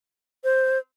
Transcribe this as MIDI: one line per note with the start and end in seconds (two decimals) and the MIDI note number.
0.44 0.78 72